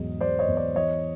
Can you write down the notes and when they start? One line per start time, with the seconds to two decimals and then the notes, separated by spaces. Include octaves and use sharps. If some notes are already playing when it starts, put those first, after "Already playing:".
Already playing: E2 G#2 F#3 D#5
0.20 F#3 C5 D5
0.39 C#5 D#5
0.48 E2
0.57 C5 D5
0.75 E3 C#5 D#5